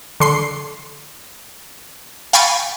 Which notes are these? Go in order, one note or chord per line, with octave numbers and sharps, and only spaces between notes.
D3 C6 C7
F5 G5 G#5 B5 C#6 A6